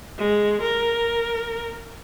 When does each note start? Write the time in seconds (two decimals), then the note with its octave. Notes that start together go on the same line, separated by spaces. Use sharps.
0.18 G#3
0.61 A#4